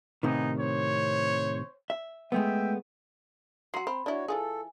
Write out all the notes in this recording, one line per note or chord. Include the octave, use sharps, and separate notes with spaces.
A2 C3 D#3 B3 D#4 G#5
C5 C#5
E5
G#3 A3 B3 E5 G5
F#3 F#4 A#5 C6 C7
C4 B5
D4 E4 F#4 C#5 D5
E3 F4 G#4 A4 G#5